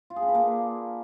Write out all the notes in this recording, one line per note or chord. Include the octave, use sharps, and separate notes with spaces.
F4
G#4
D4
B4
A#3